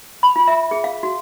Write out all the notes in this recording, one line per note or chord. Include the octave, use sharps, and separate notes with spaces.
B5
F4
E5
G#4
F5
F#4